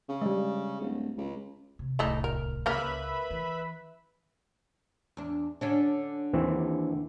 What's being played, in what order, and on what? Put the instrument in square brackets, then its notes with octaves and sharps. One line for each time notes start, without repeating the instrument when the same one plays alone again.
[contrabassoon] C#3
[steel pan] G3 G#3
[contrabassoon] D1
C#2
[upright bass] C3
[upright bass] D1 C2 [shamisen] E3 A3 D#4
[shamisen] A#4
[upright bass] C#2 [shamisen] C#3 A#3 A#4 [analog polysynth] B4 E5 B5
[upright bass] E3
[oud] E2 D4
D3 C#4 D4
[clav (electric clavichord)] D#2 E3 C4